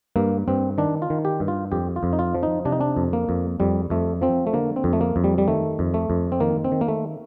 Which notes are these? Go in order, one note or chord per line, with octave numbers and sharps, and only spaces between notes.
G2 A#3
G2 C4
D#3 D4
F4
D#3
G4
G2
F4
F2 G4
F4
F2
D#4
F4
F3
D#4
C3 D4
D#4
D4
F2
A#3
F2
F2 G3
F2 A3
F3 C4
A3
D3 A#3
C4
F2
A3
A#3
F2
G3
G3
D#3 A3
F2
A3
F2
C4
D#3 A#3
C4
D#3
A#3
A3